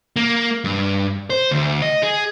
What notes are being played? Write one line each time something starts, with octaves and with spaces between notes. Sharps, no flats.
A#3
G2
C5
D2
D#5
G#4